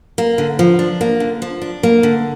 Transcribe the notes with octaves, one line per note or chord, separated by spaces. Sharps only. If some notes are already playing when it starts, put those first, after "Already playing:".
A#3
D3
F3
D4
A#3
D3
F3
D4
A#3
D3